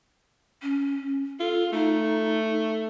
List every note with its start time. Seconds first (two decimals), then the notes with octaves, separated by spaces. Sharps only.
0.63 C#4
1.40 F4 A4
1.72 A3 D#4